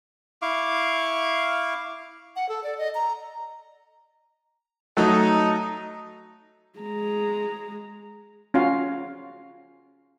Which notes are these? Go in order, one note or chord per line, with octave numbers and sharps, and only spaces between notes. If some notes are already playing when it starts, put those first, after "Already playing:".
E4 F5 C#6 D6
F#5
A4
D5
D#5
A#5
F#3 A3 D#4 A4
G#3 A#5
C#4 F4 F#4 F5